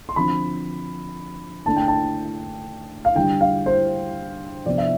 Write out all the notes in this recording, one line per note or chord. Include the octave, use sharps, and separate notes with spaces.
C6
D3 F3 C4 B5
D3 A3 D4 A5
G5
A5
F5
D3 G3 D4 G5
F5
C5
C3 F3 B3 D4 D5
E5